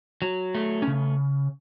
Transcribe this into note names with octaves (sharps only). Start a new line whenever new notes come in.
F#3
A3
C#4
C#3